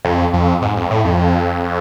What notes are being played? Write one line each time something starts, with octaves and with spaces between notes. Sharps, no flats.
F2
F2
G#2
F2
A2
F2